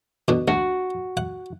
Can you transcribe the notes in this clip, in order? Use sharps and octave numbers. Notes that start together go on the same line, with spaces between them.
B2 D3
D2 F#4
F#5